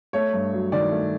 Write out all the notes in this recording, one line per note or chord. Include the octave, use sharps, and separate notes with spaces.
A3 C#5
G2
F#3
D#3 D5
A3